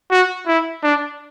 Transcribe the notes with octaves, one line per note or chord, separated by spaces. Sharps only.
F#4
E4
D4